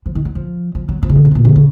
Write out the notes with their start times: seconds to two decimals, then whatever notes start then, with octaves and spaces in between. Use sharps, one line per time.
0.06 F3
0.15 D#3
0.25 F#3
0.35 F3
0.75 F3
0.89 F#3
1.03 F3
1.09 C#3
1.15 D#3
1.25 C#3
1.31 C3
1.35 A#2
1.45 C#3
1.56 C#3